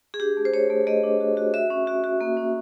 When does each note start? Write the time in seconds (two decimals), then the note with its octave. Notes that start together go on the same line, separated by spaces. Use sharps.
0.14 G#4
0.20 D4 G4
0.37 A3
0.45 C5
0.53 A3 C#5
0.70 A3
0.87 A3 D#5
1.03 D4
1.21 F#4
1.37 F#4
1.54 F#4 E5
1.70 C#4
1.87 F#4
2.04 F#4
2.21 A#3
2.37 C#4